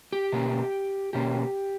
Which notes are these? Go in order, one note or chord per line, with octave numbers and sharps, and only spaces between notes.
G4
B2 A#3 C#4
B2 A#3 C#4 G4